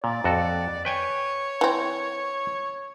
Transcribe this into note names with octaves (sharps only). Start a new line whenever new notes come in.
A#2 D5
F2 F#4 A4
B4 C#5 G5 G#5
E3 C4